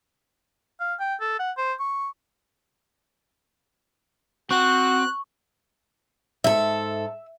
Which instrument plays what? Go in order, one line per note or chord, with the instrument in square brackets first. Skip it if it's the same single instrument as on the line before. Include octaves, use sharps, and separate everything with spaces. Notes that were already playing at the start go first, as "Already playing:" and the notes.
[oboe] F5
G5
A4
F#5
C5
C#6
[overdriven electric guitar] C4 [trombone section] F#4 [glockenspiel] C#6 [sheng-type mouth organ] F#6
[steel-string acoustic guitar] G#2 A4 [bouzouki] E5